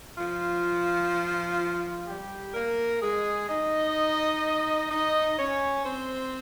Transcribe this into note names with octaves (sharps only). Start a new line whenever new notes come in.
F3 F4
G3 G4
A#3 A#4
G#3 G#4
D#4 D#5
D#4 D#5
C#4 C#5
C4 C5